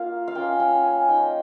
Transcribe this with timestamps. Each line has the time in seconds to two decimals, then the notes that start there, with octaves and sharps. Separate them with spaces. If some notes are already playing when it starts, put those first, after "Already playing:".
Already playing: A#3 F4 F5
0.28 F5
0.35 A#3 C#4 F4 G5
0.60 G5
0.84 G#5
1.09 A#3 D#4 G5